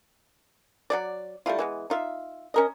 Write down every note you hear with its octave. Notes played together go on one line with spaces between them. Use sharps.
F#3 G#3 D5
G3 A3 E4 F4
E3 G#3 B3
D#4 F4 E5
C#4 A#4 D#5